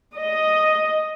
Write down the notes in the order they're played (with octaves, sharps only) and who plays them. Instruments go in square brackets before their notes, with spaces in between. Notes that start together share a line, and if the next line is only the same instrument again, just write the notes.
[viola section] D#5